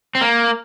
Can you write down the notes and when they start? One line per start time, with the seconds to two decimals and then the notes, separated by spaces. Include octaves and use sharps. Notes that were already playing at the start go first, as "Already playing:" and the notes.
0.15 C4
0.21 A#3